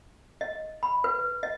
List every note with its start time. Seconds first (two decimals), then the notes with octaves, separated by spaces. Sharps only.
0.41 D#5
0.83 B5
1.04 B4
1.43 D#5